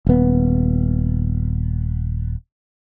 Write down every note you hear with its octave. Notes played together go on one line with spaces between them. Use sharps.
D#1 B3